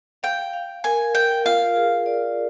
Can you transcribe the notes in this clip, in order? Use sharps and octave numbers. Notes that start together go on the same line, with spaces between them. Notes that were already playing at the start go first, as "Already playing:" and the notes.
F5 G5
F5
A#4 G#5
A#4 G5
F4 F5
G#4
D5